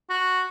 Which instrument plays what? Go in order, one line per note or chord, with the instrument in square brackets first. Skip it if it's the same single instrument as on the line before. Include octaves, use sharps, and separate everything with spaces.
[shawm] F#4